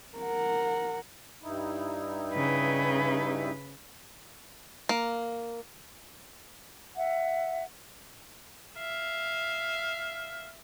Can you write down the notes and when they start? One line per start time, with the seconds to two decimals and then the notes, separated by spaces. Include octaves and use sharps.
0.17 A#4 F#5
1.43 G2 D#4 E4
2.33 C#3 B4
4.89 A#3
6.95 E5 F#5
8.77 E5 F5